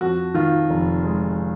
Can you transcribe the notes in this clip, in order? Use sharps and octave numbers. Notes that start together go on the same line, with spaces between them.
F2 F#4
D#3 F4
F1
G#3